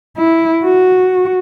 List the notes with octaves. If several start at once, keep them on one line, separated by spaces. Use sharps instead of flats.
E4
F#4